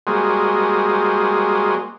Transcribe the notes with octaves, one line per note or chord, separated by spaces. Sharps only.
G3 G#3 A#3 F#4 G#4 C5